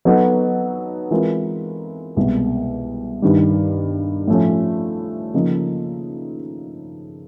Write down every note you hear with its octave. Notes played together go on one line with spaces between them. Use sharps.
F#3 B3 D#4 F#4 A4
E3 G#3 C4 F4 A#4
C2 B2 G#3
G2 D#3 G3
A2 F3 A3 C#4
C#3 F3 A#3 D#4